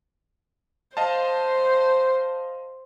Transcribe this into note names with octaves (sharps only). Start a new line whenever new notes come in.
C5 D#5 F5 A5